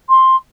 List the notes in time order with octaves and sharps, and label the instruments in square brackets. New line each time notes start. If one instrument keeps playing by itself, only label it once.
[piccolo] C6